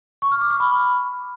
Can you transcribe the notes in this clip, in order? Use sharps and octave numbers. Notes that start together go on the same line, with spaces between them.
C#6
F6
D6
F6
B5